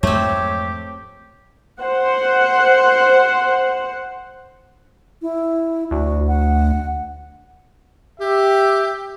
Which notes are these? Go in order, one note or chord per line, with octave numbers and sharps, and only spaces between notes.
F2 G#2 F#3 A3 C4 G4 C#5
C5 F#5
E4
D2 F#4
F#5
G4 E5